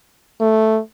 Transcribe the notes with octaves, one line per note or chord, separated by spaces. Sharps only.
A3